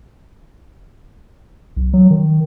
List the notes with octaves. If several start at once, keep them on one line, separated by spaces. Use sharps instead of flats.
B1
F#3
D#3